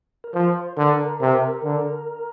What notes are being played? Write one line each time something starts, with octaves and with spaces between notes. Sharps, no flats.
A#4
F3 C5
D3 A#4
C3
D3